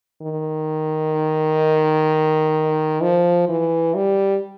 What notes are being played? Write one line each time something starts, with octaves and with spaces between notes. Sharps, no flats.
D#3
F3
E3
G3